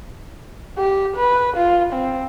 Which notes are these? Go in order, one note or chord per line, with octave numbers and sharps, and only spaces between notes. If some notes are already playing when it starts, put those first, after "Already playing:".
G4
B4
F4
C4